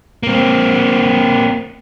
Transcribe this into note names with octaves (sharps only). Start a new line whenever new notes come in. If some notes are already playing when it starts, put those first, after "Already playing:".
A#3 C4